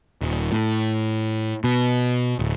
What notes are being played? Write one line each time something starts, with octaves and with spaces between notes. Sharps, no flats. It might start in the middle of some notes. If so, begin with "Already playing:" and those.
D#1
A2
B2
D1